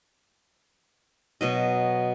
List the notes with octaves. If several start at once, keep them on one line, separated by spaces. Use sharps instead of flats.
B2 F#3 D#5